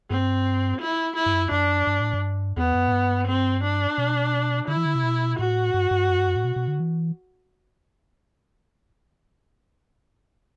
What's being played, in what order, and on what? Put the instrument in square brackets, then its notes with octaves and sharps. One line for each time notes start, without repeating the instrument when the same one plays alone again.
[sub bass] G2 [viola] C4
[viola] E4
E4
[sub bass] G2
F#2
[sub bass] F#2 [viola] D4
[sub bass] G2
A2
G2
[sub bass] E2 [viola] B3
[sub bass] F#2
A2
G2
[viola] C4
D4
[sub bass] B2
[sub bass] D3 [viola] E4
[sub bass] E3
D3
C3
B2
[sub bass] A2 [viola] F#4
[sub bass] G2
G2
F#2
G2
F#2
A2
B2
B2
D3
E3